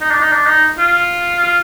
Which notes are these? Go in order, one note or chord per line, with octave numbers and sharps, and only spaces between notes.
D#4
D4
D#4
D4
D#4
F4
F4